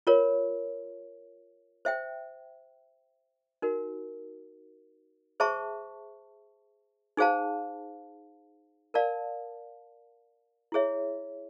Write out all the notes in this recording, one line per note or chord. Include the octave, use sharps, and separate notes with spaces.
F4 A#4 C#5
C5 E5 G5
D#4 F#4 A#4
G#4 C5 E5 A5 C#6
D#4 G#4 C5 F5 A5
A#4 D5 F5 A5
E4 G#4 C#5 E5